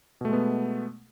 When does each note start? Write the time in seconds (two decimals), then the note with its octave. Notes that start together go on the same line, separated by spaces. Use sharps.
0.21 B2
0.25 A3
0.29 G#3
0.33 B3